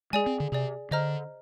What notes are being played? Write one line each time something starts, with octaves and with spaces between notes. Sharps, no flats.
G#3 G#4 D5 G#5
C4
D3
C3 G#4 D5 G#5
D3 C5 D#5 A#5 F6